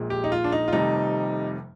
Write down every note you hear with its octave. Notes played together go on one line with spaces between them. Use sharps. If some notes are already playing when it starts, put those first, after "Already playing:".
Already playing: A#1 A#2 G#3
G4
D#4
F4
D4
D#4
F4
F1 F2 C3 D#3 G3 D#4